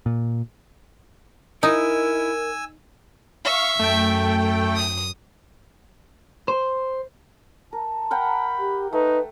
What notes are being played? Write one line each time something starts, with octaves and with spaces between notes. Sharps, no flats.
A#2
D#4 E4 A#4 G#5 E6
E5 F5 C#6
F#2 A3 G5
D#6
C5
A#4 A5
A#4 F#5 G5 B5
G4
A3 D#4 B4